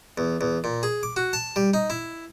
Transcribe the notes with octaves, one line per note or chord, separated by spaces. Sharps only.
E2
E2
A#2
G#4
D6
F#4
A5
G3
D#4
E4